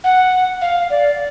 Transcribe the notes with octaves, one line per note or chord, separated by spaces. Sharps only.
F#5
F5
D5